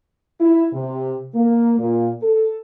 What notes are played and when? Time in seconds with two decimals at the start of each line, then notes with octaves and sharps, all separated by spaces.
0.40 E4
0.73 C3
1.34 A#3
1.79 A#2
2.23 A4